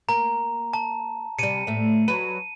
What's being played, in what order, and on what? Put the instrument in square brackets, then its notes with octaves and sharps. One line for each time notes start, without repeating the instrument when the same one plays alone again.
[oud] A#3 [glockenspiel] A#5
[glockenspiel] A5
[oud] C3 G3 [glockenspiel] C#7 D#7
[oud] A2 A3
[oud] F#3 B4 [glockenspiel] D#7